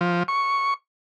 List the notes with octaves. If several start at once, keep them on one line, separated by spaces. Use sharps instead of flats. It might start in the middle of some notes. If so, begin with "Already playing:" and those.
F3
C#6